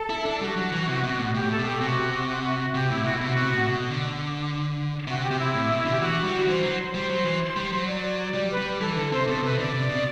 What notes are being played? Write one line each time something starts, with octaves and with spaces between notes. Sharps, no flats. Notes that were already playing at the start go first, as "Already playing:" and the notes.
Already playing: A4
E4
D4
G3 F#4
F#3
E3
C3
B2
A2
A2 G4
A4
B2
G4
C3 F#4
F#4
F#4
F#4
C3 G4
A2 E4
B2 F#4
C3 E4
F#4
C3
A2
B2
D3
C3 F#4
G4
C3
E4
A2
B2
D3
G4
E3 F#4
G3
D3
E3 C5
F#3
G3 C5
F#3
E3
G3
F#3
D5
G3
B4
G3
E3 A4
D3 A4
C3 C5
B2 A4
C3 B4
D3 D5
C3
B2